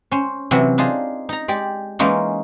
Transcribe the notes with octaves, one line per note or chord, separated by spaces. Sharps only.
C#4 C5
C3 E3 F#3
D4 D#4 F4 G#4
D#4 A#5
G#3 G4 D5
E3 G#3 A#3 C#4 D#4